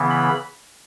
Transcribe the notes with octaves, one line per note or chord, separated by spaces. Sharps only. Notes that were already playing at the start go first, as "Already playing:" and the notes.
Already playing: C#3 E3 B3
B5